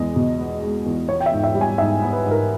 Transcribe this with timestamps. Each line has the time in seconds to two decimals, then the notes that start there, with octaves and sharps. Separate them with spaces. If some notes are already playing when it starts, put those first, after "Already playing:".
Already playing: E2 G#3 D#5
0.16 B2
0.39 B3
0.63 G#3
0.86 E2
1.09 B3 C#5
1.20 G5
1.26 E5
1.32 G#2
1.44 E5
1.55 G3
1.61 G#5
1.78 G#2 E5
2.02 B3
2.13 B4
2.26 G#2
2.31 A#4